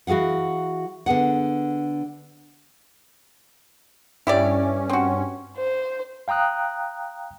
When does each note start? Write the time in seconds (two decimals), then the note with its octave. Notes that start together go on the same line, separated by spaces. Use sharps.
0.07 E3 F#4 G#4 F5 F#5
1.06 D3 B3 G#4 F#5
4.27 G2 C#4 E4 G4 D5
4.90 C4 F#4
5.57 C5
6.28 F5 G5 A#5 D#6 F#6